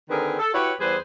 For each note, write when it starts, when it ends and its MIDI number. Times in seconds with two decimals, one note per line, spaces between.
0.09 0.37 50
0.09 0.37 51
0.09 0.37 60
0.09 0.37 68
0.09 0.37 70
0.09 0.37 71
0.39 0.51 69
0.54 0.73 64
0.54 0.73 66
0.54 0.73 67
0.54 0.73 71
0.54 0.73 73
0.80 0.96 40
0.80 0.96 55
0.80 0.96 68
0.80 0.96 71
0.80 0.96 72